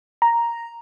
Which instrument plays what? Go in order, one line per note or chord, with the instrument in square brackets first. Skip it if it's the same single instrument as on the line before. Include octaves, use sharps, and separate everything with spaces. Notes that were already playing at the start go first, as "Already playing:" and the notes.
[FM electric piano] A#5